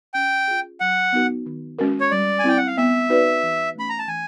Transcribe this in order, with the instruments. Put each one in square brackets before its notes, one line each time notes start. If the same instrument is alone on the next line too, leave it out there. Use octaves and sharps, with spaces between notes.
[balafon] C#4 [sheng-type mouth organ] G5
[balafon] F4 G#4
[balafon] F#3 [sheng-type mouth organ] F#5
[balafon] B3 D#4 F#4 A#4
D#3
G#3 C#4 F#4 A#4
[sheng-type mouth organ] C#5
[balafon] G3 [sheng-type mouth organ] D5
[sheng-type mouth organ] G#5
[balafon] C4 E4 [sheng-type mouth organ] G5
[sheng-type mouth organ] F#5
F5
[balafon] B3 [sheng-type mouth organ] E5
[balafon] D#4 F#4 B4 D5
E3
[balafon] A3 C#4 [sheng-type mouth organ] B5
[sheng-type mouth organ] A#5
A5
[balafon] E3 [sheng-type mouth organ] G#5